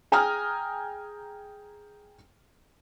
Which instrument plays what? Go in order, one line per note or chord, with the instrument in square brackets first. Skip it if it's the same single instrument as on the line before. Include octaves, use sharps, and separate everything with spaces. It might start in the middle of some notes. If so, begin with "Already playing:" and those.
[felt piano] G#4 G5 G#5 A#5 D#6 F6